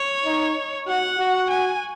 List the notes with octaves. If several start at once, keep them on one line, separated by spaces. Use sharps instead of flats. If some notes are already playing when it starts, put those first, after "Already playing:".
Already playing: C#5
D#4
F#4 F#5
F#4
G#5